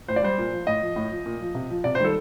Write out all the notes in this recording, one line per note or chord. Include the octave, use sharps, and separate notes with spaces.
A2 C5
D5
G3 C5
A#2
F3
A2 D#5
F3
A2
F3
A#2
F3
C3
F3
C3 D5
C5
D#3 G3 A4